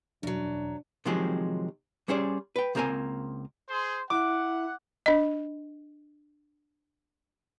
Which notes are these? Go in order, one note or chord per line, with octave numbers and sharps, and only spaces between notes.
E1 F#2 F#3 D4
C3 D#3 F3 F#3 G#3 C4
G3 C#4 G#4 C5 D5
B4 G5
C#2 A#3 C4 A#4 C5 G#5
G#4 C5 C6
E4 F#5 D6
D4 D#5